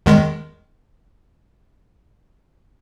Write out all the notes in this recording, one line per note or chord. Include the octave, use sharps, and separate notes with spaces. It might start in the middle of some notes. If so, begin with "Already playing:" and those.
E2 D#3 G#3